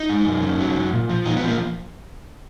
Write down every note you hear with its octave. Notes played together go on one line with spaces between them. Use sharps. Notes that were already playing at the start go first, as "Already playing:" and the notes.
Already playing: D#4
G#2
F#2
C#3
F#3
F#2
A#2
F3
A#2 D#4
B3
F3
A#3